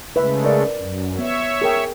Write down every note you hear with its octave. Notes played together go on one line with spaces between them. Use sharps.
C#3 G#3 A3 B4 E5
A#4 D5
F#2
B3 C#5 E5
G#4 A#4 G5